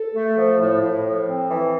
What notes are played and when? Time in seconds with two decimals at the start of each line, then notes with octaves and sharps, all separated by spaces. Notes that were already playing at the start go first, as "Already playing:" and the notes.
Already playing: A4
0.14 A3
0.36 F3
0.60 A2
0.82 A2
1.05 F3
1.28 C4
1.51 E3